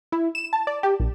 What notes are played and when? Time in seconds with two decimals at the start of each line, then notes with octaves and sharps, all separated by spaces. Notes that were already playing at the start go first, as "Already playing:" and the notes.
0.12 E4
0.35 E7
0.53 A5
0.67 D5
0.83 G4
1.00 A#1